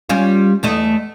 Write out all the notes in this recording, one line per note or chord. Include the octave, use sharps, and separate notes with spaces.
G3 C#4 F4
E2 A3 D#5